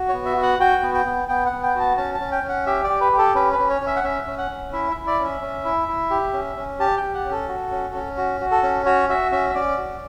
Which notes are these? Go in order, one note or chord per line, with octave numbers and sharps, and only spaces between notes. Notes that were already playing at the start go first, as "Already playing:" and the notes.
Already playing: F#4
C#5
B3
E5
F#4
F#5
F#4 G5
B3
G5
B3
B3 G5
F#5
B3
G5
F#4 A5
C#4 A5
A5
C#4
G5
C#4
F#5
G4 E5
D5
G4
B4
G4
A4
C#4 B4
B4
C#4
C#5
C#4
E5
F#5
C#4 E5
C#4
F#5
C#4
E4 E5
E5
E4
D5
C#4
E5
C#4
E4
E4
G4
C#4
C#4
G4 A5
G5
G4
F#5
C#4
A4
F#4
C#4
C#4
F#4
F#4
A4
C#4
F#4 C#5
F#4 E5
C#4 E5
E5
C#4 D5
F#4